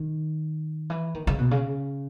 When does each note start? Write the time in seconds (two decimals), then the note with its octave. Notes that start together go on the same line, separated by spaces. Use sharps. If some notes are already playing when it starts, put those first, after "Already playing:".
Already playing: D#3
0.90 E3
1.14 D#3
1.27 C#3
1.38 B2
1.51 C#3